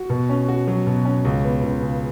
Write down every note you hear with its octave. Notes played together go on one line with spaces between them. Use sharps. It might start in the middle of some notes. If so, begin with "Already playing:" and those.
Already playing: F#4
B2
C#4
F#4
F#3
B2
C#4
C#2
B3
C#2
C#3